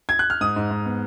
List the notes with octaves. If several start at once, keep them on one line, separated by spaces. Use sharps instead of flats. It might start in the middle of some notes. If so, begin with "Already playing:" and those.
G#6
F#6
F6
G#2 D#6
G#2
G#2
B3